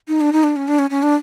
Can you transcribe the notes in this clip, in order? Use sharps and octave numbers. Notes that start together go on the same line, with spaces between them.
D#4
D4
D#4
D4
C#4
D4
C#4
C#4
D4